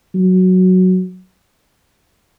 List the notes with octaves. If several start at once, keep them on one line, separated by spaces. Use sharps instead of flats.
F#3